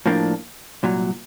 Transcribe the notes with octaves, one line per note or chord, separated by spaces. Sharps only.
A2 F3 A#3 D4
C2 A#2 F#3